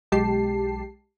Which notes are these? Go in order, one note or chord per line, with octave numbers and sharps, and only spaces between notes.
B1 G#3 G4 A5 C7